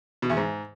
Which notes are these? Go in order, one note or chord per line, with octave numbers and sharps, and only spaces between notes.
B2
E2
G#2